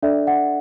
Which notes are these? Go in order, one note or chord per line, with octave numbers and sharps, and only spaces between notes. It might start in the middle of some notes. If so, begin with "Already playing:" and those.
D4 A4 D5 E5
F#5